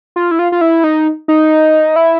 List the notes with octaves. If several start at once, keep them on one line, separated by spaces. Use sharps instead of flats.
F4
E4
F4
F4
E4
D#4
D#4
E4